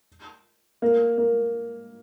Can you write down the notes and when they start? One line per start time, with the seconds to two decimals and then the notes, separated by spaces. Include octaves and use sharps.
0.82 A#3
1.18 A#3